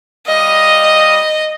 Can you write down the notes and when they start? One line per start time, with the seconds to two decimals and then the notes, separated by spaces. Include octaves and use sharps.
0.27 G3 D#5 F5 D#6